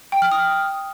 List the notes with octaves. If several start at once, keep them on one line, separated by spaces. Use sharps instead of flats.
G5
F6
D#6